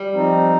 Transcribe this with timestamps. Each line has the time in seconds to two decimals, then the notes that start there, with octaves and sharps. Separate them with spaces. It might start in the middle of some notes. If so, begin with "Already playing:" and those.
Already playing: G3
0.13 F3 C4 D#4